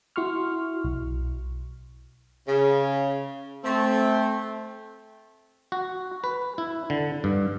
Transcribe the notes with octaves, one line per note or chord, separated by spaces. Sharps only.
E4 F#4 C6 C#6 F6
B1
C#3
A3 C4
F#4
B4
E4
D3
G2